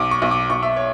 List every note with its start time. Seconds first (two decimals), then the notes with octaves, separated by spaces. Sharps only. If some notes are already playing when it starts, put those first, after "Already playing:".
Already playing: B1 D6
0.11 C#6
0.22 B1
0.31 D6
0.50 B1 C#6
0.63 E5
0.77 C#5